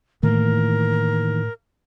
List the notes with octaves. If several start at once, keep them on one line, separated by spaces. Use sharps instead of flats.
A2 D#3 E3 A#3 A#4